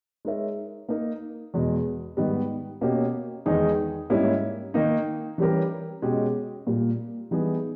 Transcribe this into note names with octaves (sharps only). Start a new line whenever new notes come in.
G#3 D#4 A#4 C#5 E5
A#3 D#4 A#4 D#5
E2 B2 G#3
G#2 D#3 G3 B3
B2 A#3 C#4 G4
E2 D#3 G#3 D#4 G#4
G#2 G3 A#3 C#4 E4
D#3 A#3 D#4
E3 G3 C#4 G4 A#4
B2 G#3 C#4 G4 C#5
A#2 G3 A#3
E3 G3 B3 D#4 G#4